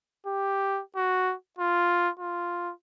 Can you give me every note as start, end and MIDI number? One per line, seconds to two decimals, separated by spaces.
0.26 0.81 67
0.96 1.34 66
1.59 2.09 65
2.19 2.72 65